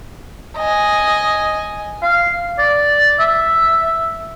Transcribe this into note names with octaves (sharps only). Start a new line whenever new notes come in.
D#5 G#5
F5
D5
E5